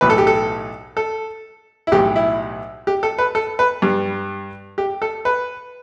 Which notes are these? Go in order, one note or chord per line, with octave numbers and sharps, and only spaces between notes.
B1 A2 E3 B4
A4
G4
A4
A4
E4
B1 A2 E3 G3 G4
E4
G4
A4
B4
A4
B4
G2 G3
G4
A4
B4